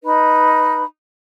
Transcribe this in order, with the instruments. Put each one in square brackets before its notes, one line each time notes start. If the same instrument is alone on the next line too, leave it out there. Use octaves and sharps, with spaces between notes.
[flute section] D#4 B4 D#5 B5